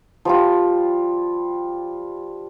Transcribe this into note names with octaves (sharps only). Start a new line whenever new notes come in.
F3 G3 F4